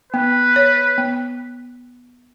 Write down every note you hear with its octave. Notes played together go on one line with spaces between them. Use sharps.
B3 B4
C#5
B3